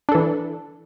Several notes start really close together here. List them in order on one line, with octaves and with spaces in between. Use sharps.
D4 A4 E3